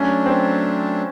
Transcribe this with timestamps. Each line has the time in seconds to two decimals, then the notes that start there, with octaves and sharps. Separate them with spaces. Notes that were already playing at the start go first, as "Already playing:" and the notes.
Already playing: F#3 A3 C#4 D4
0.26 C4